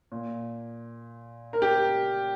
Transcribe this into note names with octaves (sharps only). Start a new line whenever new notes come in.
A#2
A#4
G4